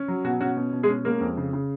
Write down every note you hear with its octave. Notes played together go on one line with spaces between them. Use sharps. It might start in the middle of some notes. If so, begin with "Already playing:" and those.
Already playing: C#4
F#3
B2 F#4
C#4 F#4
B2
B2
G#3 G#4
C#4
G#3 A#3 A#4
F2
C#3
C#3